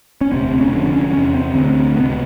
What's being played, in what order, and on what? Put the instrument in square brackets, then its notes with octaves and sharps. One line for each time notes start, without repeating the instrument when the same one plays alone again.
[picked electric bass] C#4
E1 D2 C3 C4
C#4
F1 F2 D3 D4
C#4
F#1 E2 C3 C#4
C4
D2 D3 C4
C#2 C3 B3